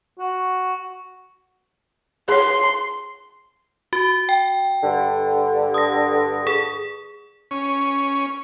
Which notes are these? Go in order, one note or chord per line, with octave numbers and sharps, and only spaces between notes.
F#4
G#4 C#5 C6
F#4
G5
G2 D3
D#6 A#6
G#4
C#4